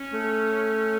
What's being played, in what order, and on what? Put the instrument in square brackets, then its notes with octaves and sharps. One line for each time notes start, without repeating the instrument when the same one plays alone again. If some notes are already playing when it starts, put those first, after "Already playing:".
Already playing: [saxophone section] C#4
[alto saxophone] A3